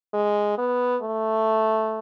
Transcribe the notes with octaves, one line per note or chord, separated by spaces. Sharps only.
G#3
B3
A3